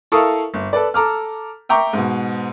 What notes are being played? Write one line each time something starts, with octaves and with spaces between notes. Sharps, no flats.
E4 A4 A#4 F5 C#6 D#6
G1
A4 B4 D5
A4 A#5 D6 F6
E5 G5 A#5 C#6 D6
G#2 B2